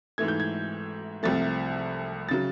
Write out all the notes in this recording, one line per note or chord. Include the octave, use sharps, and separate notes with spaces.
G#2 E3 A3 G#6
G6
G#6
C2 C3 F3 A3 A6
C#3 F#3 A6